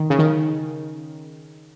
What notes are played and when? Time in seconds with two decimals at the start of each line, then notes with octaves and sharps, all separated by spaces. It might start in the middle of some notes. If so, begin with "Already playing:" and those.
Already playing: D#3
0.10 C#3
0.19 D#3